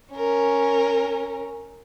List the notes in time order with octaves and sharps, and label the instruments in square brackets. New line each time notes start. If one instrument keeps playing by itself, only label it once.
[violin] C#4 A#4